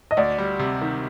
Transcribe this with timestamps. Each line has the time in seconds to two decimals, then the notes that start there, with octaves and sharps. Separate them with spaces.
0.11 D#5
0.17 D2 D5
0.38 G3
0.59 C3
0.82 D#3